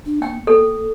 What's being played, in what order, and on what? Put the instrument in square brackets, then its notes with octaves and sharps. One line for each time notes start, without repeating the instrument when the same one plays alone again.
[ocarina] D4
[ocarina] A#3 [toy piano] G5
[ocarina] A#3 [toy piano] A4